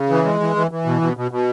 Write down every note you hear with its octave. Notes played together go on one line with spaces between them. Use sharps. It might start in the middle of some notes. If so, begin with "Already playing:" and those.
Already playing: C#3
E3
G#3
E3
E3
E3
B2
B2
B2
B2